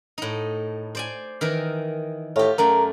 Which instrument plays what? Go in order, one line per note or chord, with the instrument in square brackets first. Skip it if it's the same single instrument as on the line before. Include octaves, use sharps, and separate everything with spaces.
[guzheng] A2 D#4
C5 D5 G#5
D#3 E3 A#4
[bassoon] A2 [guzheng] F4 G4
[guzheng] F#2 A3 D5 [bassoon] A#4